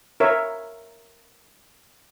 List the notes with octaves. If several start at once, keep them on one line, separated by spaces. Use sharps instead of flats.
A#4 C#5 E5